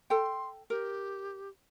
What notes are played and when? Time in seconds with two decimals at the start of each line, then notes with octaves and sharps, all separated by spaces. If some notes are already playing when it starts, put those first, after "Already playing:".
0.10 A4 G5 C6
0.70 G4 A#4